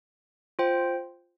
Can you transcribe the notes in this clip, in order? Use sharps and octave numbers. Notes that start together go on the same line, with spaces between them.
F4 C5 G5